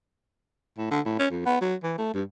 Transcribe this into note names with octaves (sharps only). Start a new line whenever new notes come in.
A2
D3
A2
C#4
F2
B3
F#3
E3
A3
G2